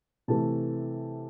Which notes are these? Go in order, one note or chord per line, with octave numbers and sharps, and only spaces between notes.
C3 E3 A3 A5